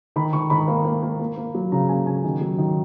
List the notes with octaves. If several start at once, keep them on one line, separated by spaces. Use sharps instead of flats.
D#3 B5
D#3 C#6
D#3 B5
A#3
A#3
A#3
A#3
A#3
F#3
C#3 A#5
A#3 G#5
C#3 G#5
D#3
F#3
D#3